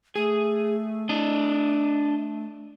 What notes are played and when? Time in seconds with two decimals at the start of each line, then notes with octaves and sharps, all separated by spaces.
0.16 A3 G#4
1.09 D4 D#5